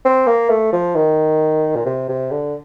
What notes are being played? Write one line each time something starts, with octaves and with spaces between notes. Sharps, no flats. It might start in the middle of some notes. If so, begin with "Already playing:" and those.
C4
A#3
A3
F3
D#3
A#2
C3
C3
D3